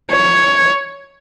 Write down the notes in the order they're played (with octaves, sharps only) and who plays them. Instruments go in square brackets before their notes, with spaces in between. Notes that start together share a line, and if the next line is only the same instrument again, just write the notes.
[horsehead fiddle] C#5